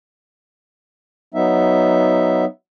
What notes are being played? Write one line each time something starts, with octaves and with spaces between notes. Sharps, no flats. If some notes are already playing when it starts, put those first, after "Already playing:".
F#3 B3 D#4 E5